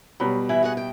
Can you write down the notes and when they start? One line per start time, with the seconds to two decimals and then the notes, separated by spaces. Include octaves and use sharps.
0.20 B2 F#3 G3 B5
0.49 E3 E4 E5
0.63 F#4 G#4 F#5
0.77 G5